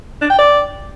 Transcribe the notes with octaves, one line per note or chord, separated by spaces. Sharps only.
D4
G5
D5